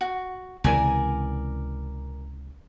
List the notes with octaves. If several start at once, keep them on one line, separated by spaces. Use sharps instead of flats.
F#4
C#2 C3 E3 A#4 D5 G#5